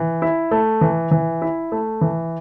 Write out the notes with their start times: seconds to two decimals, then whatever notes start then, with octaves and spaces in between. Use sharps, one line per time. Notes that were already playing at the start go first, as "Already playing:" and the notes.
Already playing: E3
0.22 E4
0.51 A3
0.81 E3
1.11 E3
1.42 E4
1.72 A3
2.01 E3